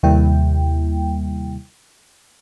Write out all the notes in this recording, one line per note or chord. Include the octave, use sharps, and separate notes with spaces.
D#2 C3 G3 A#3 E4 G5